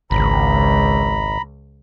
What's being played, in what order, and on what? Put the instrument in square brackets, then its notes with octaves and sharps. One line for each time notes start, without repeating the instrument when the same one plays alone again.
[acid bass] G#1 [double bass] C#2 [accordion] A#5 B5